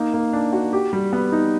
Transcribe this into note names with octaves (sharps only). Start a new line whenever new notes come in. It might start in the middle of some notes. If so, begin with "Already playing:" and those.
Already playing: A#3 D#4
A#3
D4
F#4
G4
G3
B3
D#4